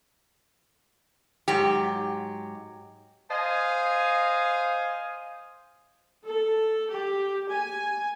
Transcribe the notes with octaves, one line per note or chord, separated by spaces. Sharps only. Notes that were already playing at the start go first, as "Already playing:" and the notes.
G#2 F#3 G4
C5 D#5 F5 G#5
A4
G4
G#5